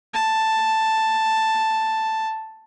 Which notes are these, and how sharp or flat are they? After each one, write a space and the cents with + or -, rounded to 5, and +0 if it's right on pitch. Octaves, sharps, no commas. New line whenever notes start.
A5 +5